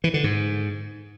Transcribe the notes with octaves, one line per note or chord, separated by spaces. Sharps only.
E3
D3
G#2